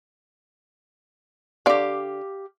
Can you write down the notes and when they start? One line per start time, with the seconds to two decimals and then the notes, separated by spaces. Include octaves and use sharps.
1.66 D3 G4 D5 F5